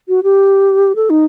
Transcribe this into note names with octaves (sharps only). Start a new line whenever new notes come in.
F#4
G4
A4
D#4